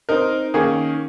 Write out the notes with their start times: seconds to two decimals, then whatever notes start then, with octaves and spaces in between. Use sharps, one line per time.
0.09 C4 D#4 A#4
0.54 D#3 A#3 C#4 G#4